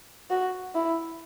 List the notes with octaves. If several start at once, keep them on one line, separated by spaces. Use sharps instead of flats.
F#4
E4